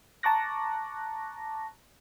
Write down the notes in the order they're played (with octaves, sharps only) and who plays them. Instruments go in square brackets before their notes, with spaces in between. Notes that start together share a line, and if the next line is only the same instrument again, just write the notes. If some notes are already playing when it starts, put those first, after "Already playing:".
[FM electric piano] A5 A#5 C#6 D6 F#6 A#6